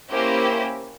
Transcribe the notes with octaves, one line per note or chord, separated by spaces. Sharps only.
A#3 C#4 E4 G4 C5